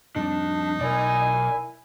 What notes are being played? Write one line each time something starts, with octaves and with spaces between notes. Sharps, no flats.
F2 G3 C4 D4 D#4
B1 E4 A#4 D5 G#5